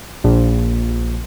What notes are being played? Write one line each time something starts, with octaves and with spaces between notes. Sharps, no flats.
A#1